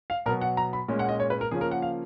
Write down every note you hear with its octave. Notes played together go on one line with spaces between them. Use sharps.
F5
B2 F#3 B3 A#4
F#5
A#5
B5
A#2 G#3 C#4
F#5
D#5
C#5
B4
A#4
C#3 F3 A#3 C#4 G#4
A#4
F#5
F5